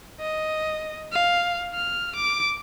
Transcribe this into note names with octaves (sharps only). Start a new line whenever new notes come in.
D#5
F5
F6
D6